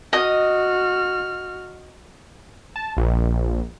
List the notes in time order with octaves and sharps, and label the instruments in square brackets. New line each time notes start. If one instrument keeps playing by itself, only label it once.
[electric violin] F#4 F6 [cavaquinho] D#5 D#6
[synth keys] A5
A#1